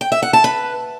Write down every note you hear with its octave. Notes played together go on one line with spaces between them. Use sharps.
G5
E5
F#5
A5
B4